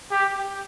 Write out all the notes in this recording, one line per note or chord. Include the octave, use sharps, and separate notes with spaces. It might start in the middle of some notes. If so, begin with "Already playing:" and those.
G4